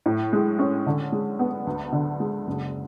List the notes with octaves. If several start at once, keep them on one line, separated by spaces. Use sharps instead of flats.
A2
G#3
C#4
D3
G#3
B3
D2
D3
G#3
F#1